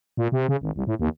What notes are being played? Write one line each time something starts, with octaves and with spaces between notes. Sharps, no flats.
A#2
C3
C#3
G#1
C2
A2
D#2